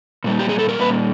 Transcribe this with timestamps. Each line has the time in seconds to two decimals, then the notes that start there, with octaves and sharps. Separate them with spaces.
0.24 A#2 G3 A#3
0.39 G4
0.49 G#4
0.59 A4
0.69 A#4
0.79 A#2 G3 A#3 B4